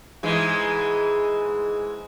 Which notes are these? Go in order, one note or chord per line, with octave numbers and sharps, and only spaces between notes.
G#2 E3 G#3